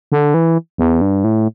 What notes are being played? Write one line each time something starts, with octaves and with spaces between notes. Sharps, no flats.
D3
E3
E2
G2
A2